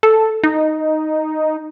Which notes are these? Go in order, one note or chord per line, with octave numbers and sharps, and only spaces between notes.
A4
D#4